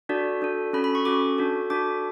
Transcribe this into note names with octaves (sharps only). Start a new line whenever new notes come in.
D4 F#4 A4 D5
D4 F#4 A4
C#4 F#4 A4 B5
B5
C#6
C#4 F#4 A4 D6
D4 F#4 A4
D4 F#4 A4 D6